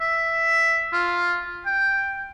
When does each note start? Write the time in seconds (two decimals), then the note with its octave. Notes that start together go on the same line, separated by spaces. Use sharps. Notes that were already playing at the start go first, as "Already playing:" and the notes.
0.01 E5
0.93 F4
1.66 G5